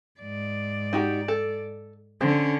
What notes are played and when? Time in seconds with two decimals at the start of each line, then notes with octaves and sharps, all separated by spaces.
0.20 G#2 D5
0.93 D#4 F#4 G4
1.28 A4
2.21 D3 C4 C#4